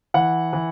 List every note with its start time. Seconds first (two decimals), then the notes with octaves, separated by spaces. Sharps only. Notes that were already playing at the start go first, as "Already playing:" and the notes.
0.14 E3 F#5
0.53 E3